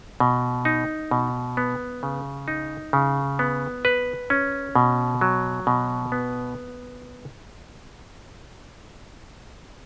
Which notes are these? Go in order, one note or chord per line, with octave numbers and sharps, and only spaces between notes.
B2
D#4
B2
B3
C#3
D#4
C#3
B3
B4
C#4
B2
F#3
B2
B3